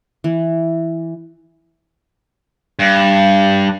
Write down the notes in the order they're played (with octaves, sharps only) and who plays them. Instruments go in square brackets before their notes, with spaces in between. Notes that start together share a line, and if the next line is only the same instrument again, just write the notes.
[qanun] E3
[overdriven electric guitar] G2